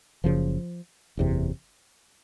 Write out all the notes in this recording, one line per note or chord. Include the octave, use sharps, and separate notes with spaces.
F#1 F#2 C#3 F3
F#1 E2 C3